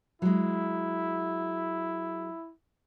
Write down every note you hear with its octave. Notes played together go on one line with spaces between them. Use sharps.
F#3 G#3 E4